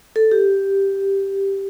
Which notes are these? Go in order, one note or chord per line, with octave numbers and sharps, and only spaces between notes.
A4
G4